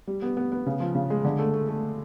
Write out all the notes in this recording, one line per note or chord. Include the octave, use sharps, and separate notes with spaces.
G3
B3
B3
B3
C#3
F3
C#3
G#3
D3
A3
A3
A3